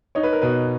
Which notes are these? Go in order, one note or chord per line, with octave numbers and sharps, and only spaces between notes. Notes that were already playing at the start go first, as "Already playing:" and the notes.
D#4 C#5
B4
A#4
B2 B4